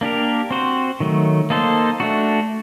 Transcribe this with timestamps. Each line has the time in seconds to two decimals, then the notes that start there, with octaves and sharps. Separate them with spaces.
0.01 A#3 D4 G4 A#4
0.51 C4 F#4 C5
1.00 D#3 F#3 A3
1.50 A#3 D#4 A4 C5
2.00 A3 D4 F#4